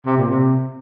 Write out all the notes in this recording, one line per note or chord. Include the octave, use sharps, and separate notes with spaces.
C3
A#2
C3